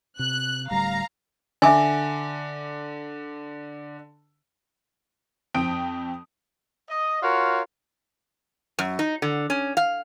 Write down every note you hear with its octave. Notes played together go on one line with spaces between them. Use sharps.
C3 F#6
D1 D2 G3 F5 A#5
D3 E5 G#5 D6
F2 C4 G5 D#6 D7
D#5
F4 F#4 A#4 C#5
F#2
D#4
D3
C#4
F5